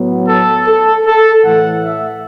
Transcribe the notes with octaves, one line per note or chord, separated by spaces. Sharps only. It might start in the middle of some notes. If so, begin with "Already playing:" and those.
Already playing: A2 F#3 B3
A4
A4
A4
A2 E3 A3 F#5
E5